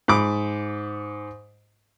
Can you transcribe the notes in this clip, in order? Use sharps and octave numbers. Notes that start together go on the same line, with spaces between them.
G#2 B5 D6